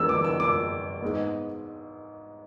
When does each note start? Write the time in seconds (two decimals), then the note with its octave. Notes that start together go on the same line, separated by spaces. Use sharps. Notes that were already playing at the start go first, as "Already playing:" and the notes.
Already playing: E2 D3 G#3 B3 E6
0.09 D6
0.24 E6
0.40 D6
1.02 G#2 G#3 B3